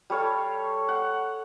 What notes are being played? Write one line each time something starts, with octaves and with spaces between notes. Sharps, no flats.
G3 A4 C#5 F5
F#5